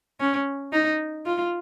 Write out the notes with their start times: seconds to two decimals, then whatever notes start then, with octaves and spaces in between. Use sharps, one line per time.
0.20 C#4
0.73 D#4
1.26 F4